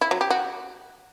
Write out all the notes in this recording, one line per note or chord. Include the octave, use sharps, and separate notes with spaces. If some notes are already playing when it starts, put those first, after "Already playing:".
E4
F#3
G4
F#4